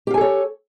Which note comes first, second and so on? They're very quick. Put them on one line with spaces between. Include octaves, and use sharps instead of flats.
G4 F5 G#5 A4 C#5